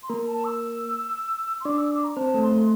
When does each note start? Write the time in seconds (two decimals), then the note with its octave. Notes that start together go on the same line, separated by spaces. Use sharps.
0.03 C6
0.09 A#3 A#4 A#5
0.27 A5
0.44 E6
1.61 C6
1.65 D4 D5 D6
1.78 E6
1.91 D6
2.04 A#5
2.16 C4 C5 A5
2.34 A3 A4
2.43 C6
2.51 A3 A4